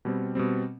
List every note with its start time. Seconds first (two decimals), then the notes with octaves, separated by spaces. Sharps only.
0.05 B2 G3 C4
0.35 B2 G3 C4